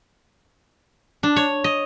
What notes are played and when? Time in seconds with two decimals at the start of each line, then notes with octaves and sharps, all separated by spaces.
1.23 D4
1.36 C#5
1.64 D#5